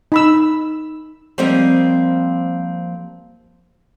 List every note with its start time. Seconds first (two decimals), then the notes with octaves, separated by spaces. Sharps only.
0.12 D#4 B5 E6
1.38 F3 G3 A#3 C4 D#5